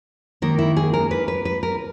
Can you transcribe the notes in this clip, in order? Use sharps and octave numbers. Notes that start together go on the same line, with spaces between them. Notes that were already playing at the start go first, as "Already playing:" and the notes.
D#3 A#3 A#4
E4
G#4
A#4
B4
B4
B4
A#4